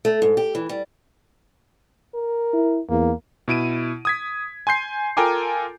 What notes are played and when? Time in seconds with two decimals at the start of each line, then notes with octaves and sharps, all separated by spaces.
0.05 A3
0.22 G#2
0.37 G4
0.55 E3
0.69 G3
2.15 A#4
2.53 E4
2.90 E2 A#3
3.48 B2 E4 D7 D#7
4.05 D#6 G#6 B6
4.67 G#5 C6 G6 C7
5.17 F4 A4 A#4 G5 G#5 D6